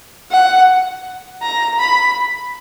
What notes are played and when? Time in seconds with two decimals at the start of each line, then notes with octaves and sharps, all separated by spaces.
0.32 F#5
1.43 A#5
1.80 B5